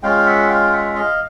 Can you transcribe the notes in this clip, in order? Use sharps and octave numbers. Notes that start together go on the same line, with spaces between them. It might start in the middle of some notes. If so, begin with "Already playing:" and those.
G#3 C#4 F4 F5 G5
E5 F#5
F5 G5
E5 F#5
D#5 F5